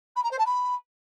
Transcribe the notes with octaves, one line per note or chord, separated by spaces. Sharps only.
B5
A#5
C5
A5
B5